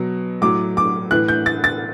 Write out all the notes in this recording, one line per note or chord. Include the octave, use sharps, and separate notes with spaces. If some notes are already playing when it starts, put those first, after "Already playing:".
Already playing: B2 F#3
A2 F#3 D6
D6
A2 E3 F#6
G6
A6
A6